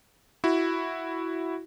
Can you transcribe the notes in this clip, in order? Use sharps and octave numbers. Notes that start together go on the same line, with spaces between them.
E4 F#4